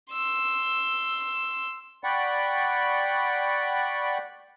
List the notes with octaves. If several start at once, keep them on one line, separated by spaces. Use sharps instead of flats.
C6 E6
D5 F#5 G5 B5 C#6